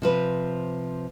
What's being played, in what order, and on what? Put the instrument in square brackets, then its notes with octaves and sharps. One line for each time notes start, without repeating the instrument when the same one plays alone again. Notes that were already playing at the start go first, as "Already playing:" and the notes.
[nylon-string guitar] C3 F3 B4